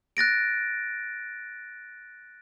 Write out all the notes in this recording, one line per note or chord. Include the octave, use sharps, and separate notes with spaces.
F#6 A6 A#6 D7